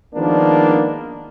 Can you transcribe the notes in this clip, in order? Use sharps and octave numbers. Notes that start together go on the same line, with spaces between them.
D#3 F3 G#3 A#3 B3 D4